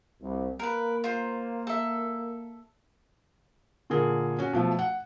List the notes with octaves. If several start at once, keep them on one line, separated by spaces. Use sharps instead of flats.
C2
A#3 A#4 B4
F4 C5
A4 E5
A#2 D3 G#4 A#4
C#4 F#4
B2 F3 A3
F#5